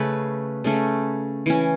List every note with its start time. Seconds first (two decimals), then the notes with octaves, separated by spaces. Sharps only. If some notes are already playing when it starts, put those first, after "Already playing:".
Already playing: C#3 A3 C#4 B4
0.64 C#3 A3 C#4
1.46 E3 C#4